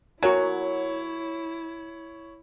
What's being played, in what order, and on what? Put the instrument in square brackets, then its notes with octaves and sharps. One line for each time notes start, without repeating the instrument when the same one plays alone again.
[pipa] F#3 [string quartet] E4 [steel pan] F#4 A#4 G#5 [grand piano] C#5